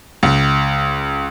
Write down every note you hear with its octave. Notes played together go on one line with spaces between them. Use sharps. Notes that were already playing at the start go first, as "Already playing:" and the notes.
C#2